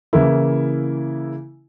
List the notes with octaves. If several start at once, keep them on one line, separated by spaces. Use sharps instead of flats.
C#3 E3 A#3 E4